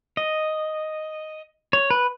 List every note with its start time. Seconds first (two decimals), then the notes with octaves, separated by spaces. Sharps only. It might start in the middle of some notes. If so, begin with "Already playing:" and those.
0.17 D#5
1.73 C#5
1.90 B4